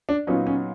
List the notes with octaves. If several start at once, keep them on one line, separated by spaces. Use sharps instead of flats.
D4
A#2 F#3 B3 C#4 D#4
C#4